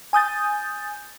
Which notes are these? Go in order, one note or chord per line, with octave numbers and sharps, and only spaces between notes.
G#5 D#6 G6 A6